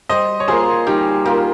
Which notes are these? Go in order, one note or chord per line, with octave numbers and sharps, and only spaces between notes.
G3 C5 D#5
C#5
A#3 F4 G#4 C5
G3 D#4 G4
A#3 F4 G4 A#4